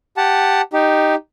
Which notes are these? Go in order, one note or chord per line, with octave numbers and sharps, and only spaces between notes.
G4 F#5 A5
D#4 G4